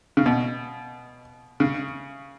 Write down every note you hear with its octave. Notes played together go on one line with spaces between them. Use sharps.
C#3
B2
C#3